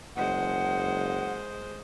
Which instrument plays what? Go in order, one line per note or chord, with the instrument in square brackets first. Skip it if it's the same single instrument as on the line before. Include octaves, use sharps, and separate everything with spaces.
[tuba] F#1 [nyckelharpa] G#3 C5 [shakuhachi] F#5